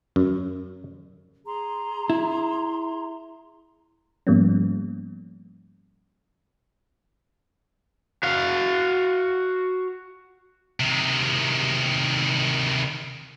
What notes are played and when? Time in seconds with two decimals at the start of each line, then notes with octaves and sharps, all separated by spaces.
0.16 F#2
1.46 G#4 A#5 C6
2.10 E4
4.27 G#2 F3 G3 A#3 B3 C#4
8.23 F#4 F5
10.80 C3 D#3